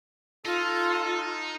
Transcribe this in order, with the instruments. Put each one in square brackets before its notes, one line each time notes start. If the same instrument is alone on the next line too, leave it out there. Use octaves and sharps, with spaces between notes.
[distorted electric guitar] D#4 [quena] F4 [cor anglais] A4